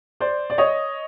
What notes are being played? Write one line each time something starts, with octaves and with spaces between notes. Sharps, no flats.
C5 D5
D5
C#5 D#5